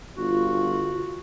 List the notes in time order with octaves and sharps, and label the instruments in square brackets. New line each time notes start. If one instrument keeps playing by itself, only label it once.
[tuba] G1 [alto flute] F4 [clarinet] F#4